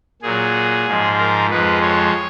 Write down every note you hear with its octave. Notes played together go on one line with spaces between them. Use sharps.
A#2 F#3 G#4
G#2 F3 G#3
A#4
F2 F3 G#3 B4
C#5